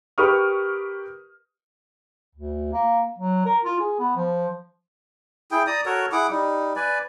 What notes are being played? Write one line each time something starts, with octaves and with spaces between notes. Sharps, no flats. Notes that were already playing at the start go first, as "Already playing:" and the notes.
G4 A#4 B4 C#6 D#6 F6
D2
A#3
F#3
A#4
F4
G#4
B3
F3
E4 G#4 G5
D5 A#5 D#6
F#4 A4 A#4 C#5
E4 G#4 F#5 D6
G3 D#4
B4 D5 G#5